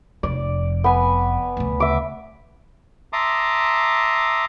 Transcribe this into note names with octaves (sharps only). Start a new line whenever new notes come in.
F1 F2 D5
B3 B4 G#5
D2 C#3
E5 D6
E5 A5 A#5 C6 D6 D#6